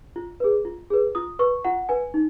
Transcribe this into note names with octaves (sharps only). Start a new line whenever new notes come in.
F4
G#4 B4
F4
G#4 B4
F4 D#6
B4 C#6
F4 F#5
B4 G#5
D#4